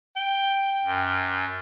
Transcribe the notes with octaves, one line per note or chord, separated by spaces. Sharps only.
G5
F#2